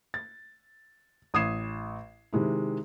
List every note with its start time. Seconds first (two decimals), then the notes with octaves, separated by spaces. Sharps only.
0.14 A6
1.34 A1 D#6 G#6 C7 E7
2.33 C3 D#3 G#3 E4